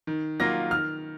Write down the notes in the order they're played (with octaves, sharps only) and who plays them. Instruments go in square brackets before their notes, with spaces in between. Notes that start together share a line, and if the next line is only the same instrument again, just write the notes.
[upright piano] D#3
F#3 A#3 F4 A#6
D#3 F6